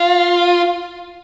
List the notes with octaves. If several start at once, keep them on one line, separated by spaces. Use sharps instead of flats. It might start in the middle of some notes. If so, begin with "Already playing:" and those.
Already playing: F4